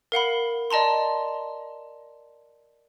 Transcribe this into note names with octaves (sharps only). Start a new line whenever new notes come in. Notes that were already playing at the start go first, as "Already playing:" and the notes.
A#4 F5 F#5 B5
D5 D#5 A5 A#5 C6